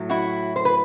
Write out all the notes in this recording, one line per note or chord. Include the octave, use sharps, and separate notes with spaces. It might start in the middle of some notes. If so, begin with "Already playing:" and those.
Already playing: A2 F#3 A3
E4 F#4
C5
B4